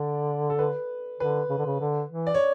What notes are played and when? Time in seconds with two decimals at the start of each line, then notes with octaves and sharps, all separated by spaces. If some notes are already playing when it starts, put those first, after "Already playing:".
Already playing: D3 D5
0.50 A4
0.59 B4
1.20 D3 B4
1.50 C#3
1.58 D3
1.66 C#3
1.81 D3
2.11 E3
2.27 D5
2.34 C#5